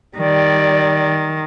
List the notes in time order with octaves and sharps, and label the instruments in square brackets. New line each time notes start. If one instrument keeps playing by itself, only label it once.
[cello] D#3 [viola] G3 D5